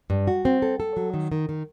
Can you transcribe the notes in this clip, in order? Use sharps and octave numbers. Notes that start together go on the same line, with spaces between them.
G2
F#4
C4
A4
A4
F#3
D#3
D#3
D#3